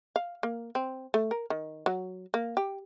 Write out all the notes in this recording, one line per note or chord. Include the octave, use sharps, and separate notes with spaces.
F5
A#3
C4
A3
A#4
D#3
F#3
A#3
G4